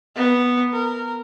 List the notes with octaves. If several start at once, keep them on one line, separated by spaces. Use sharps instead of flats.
B3
A#4